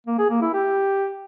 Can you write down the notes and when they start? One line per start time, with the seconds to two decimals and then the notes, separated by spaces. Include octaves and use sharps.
0.07 A#3
0.18 G#4
0.30 A#3
0.42 E4
0.53 G4